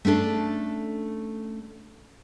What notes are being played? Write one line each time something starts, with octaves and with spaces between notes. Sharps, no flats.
A3 C#4 D4 A4